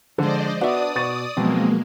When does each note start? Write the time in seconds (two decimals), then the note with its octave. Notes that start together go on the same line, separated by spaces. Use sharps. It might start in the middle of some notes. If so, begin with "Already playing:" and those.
0.18 D3 F3 G#3 C5 D5 D#5
0.61 B3 D4 F#4 D5 E5 D#6
0.96 B2 C#6 A6 D#7
1.37 B2 F3 F#3 G#3 A#3 C4